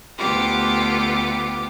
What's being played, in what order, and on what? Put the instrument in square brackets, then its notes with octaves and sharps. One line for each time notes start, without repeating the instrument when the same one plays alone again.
[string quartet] D2 B3 F4 G4 D6